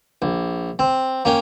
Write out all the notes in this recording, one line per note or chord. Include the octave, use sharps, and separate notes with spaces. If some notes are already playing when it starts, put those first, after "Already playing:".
A#1
C4
A#3 C#4 G5